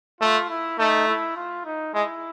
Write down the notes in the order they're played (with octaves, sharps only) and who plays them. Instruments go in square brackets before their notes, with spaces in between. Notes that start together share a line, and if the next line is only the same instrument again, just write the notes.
[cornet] A3 [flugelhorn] F4
[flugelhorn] E4
[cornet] A3 [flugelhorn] D#4
[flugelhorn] E4
F4
D#4
[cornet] G#3 [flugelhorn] E4